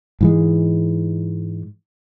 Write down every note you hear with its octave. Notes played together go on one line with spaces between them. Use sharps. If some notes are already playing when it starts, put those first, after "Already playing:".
G#2 E3 G#3